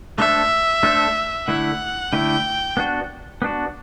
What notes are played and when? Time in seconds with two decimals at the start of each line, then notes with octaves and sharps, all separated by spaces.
0.18 A3 D4 A4 C5 E5
0.83 A3 D4 A4 C5
1.47 D3 A3 E4 F#5
2.13 D3 A3 E4 G5
2.77 B3 D4 F#4
3.42 B3 D4 F#4